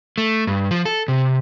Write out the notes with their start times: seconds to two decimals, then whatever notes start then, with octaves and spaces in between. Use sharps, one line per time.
0.18 A3
0.47 G2
0.71 F3
0.85 A4
1.08 C3